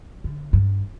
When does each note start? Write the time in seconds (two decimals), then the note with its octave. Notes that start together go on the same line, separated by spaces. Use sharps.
0.24 D3
0.53 G2